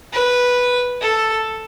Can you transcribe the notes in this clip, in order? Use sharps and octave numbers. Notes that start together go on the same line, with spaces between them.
B4
A4